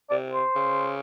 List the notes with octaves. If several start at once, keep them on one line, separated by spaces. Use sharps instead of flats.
C3 D5
C5
C#3